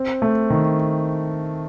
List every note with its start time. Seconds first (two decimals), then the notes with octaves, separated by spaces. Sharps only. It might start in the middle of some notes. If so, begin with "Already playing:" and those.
Already playing: C4
0.22 A3
0.50 D#3